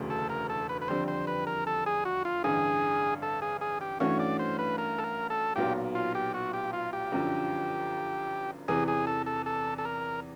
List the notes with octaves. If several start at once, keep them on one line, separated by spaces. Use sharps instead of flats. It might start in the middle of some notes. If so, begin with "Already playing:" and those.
Already playing: E1 D2 C#3 F#3 A3
A4
A#4
A4
B4
B4
F2 D3 G3 C4 C5
C5
B4
A#4
A4
G#4
F#4
F4
A1 G2 D3 G#4
A4
G#4
G#4
G4
G2 E3 A3 C#4 F#4 C#5
D5
C5
B4
A#4
A4
A#4
A4
B1 A#2 F#3 B3 G4
F4
G4
F#4
G4
F4
G4
G1 F#2 D3 F3
E2 C3 E3 G#4
G#4
A4
A4
A4
A4
A#4